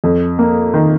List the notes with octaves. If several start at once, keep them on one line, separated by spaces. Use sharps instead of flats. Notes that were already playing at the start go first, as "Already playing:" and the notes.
F2
A#3
D#3